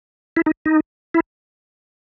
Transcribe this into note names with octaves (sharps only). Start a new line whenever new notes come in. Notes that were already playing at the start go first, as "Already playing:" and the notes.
E4
D#4
D#4
E4